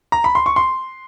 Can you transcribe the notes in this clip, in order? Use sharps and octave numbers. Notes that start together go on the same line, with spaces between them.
A#5
B5
C6
C#6
C6